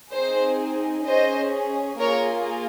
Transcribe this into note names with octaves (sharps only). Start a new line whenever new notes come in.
C4 D#4 G#4 C5
C#4 G#4 C5 D#5
A#3 F4 G#4 A#4 C#5